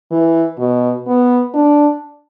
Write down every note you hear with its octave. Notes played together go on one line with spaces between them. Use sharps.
E3
B2
B3
D4